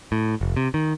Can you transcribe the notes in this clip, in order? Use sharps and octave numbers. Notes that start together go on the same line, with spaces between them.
A2
F1
C3
D#3